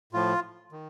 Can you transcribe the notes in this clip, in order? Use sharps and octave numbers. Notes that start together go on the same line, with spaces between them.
A2 F3 F4
D#3